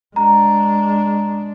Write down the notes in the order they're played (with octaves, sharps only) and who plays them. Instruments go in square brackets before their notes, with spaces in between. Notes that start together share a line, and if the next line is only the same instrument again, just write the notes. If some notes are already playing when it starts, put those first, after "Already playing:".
[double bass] G#3 D4 [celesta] A#5